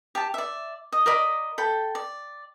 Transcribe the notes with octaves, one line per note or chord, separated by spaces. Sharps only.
G4 A5
D5 E5
D#5
A#4 D5 D#5 B5
A4 G5 B5
D5